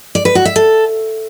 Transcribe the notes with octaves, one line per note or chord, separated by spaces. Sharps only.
D5
B4
F#4
E5
A4